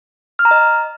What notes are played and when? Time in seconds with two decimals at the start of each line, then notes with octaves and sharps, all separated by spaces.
0.39 F6
0.45 A#5
0.51 D#5